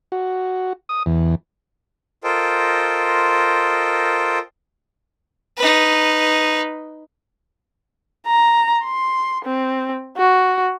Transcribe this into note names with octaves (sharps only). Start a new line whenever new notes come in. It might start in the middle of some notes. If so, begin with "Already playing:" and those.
F#4
D#6
E2
F4 A4 A#4 C5 D#5 G5
D#4 B4
A#5
C6
C4
F#4